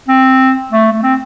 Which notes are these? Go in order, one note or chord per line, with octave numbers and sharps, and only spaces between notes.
C4
A3
A3
C4